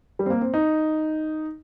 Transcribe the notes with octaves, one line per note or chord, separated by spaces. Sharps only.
G3
C4
A#3
C4
D#4